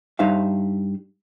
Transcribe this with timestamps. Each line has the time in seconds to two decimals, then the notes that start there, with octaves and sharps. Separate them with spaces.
0.19 G2 D#4 C5 E5 F5